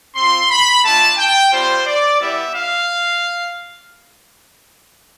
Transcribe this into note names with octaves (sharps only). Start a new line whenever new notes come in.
C4 F4 C6
B5
A3 D4 F4 A5
G5
G3 C4 F4 C5
D5
G3 B3 E4 G4 E5
F5